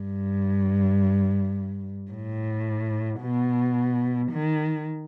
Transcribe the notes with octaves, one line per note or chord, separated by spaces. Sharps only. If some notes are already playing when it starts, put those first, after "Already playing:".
Already playing: G2
A2
B2
D#3